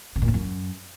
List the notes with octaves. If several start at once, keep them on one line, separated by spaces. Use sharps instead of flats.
C3
A#2
G#2
F#2